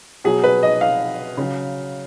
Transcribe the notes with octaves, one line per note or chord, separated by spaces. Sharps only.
B2 F#3 G#4
B4
D#5
F5
C#3 F#3